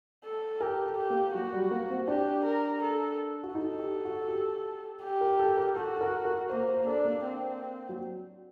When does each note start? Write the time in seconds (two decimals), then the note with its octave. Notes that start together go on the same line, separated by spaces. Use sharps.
0.24 A4
0.60 G4 A#4
0.86 A4
0.97 G4
1.10 A#3
1.34 F#3 F#4
1.53 G3
1.71 A#3
1.90 C4
2.07 D4 G4
2.44 A#4
2.82 A4
3.43 F#4
3.55 D#4 A4
3.79 G4
4.05 F#4
4.28 G4
5.03 G4
5.21 A#4
5.39 A4
5.57 A#4
5.76 F#4 A4
5.96 A4
6.01 A#4
6.25 A#4
6.49 A#3 C5
6.68 C5
6.87 D4 A4
7.05 A#3
7.24 C4
7.89 F#3